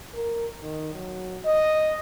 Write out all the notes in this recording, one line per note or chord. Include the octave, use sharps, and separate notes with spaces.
A#4
D#3
F#3
D#5